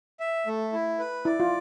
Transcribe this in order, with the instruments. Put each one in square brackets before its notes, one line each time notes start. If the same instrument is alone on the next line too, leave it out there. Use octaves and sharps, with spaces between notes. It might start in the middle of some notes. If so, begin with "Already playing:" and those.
[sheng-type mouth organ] E5
A3
E4
B4
[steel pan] E4 [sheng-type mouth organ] D5
[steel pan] F4